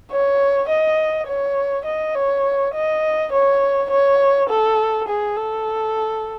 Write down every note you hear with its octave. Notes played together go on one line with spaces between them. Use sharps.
C#5
D#5
C#5
D#5
C#5
D#5
C#5
C#5
A4
G#4
A4